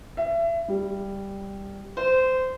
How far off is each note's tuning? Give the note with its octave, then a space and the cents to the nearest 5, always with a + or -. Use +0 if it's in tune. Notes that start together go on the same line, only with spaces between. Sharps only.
E5 +30
G3 +5
C5 -20